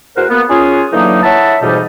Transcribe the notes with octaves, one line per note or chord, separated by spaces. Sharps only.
E2 F#4 A#4 C5 F#5
A#3 B3
C#4 F4 G#4
D3 E3 F#3 A#3 D#4
E4 C#5 E5 F#5 A5
F2 G#2 B2 E3 G3 D#4